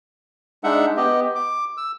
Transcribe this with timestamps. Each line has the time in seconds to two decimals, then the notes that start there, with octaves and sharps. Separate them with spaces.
0.64 G#3 D4 D#4 E5 F#5
0.97 B3 G4 D#5
1.35 D6
1.77 E6